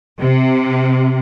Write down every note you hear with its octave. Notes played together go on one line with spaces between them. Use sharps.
C3